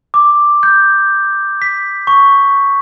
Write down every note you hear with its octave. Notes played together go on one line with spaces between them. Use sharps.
D6
G6
B6
C#6